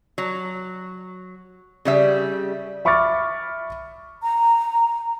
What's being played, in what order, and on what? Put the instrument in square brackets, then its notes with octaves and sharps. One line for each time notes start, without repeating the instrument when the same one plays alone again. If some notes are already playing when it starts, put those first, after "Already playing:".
[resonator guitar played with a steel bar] F#3
C#3 G3 E5
[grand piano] E5 B5 C#6 D6 F6 A6
[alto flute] A#5